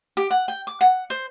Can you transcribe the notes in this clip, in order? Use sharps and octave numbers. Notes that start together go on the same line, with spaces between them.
G4
F#5
G5
D6
F#5
C5